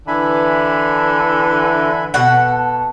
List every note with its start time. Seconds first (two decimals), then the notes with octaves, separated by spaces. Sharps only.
0.07 D3 E3 E5 G#5 B5
2.14 B2 A4 F#5